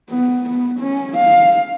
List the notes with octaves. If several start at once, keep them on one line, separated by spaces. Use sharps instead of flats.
B3
B3
C#4
F5